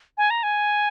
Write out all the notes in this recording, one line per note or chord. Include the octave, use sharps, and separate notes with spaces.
G#5
A#5
G#5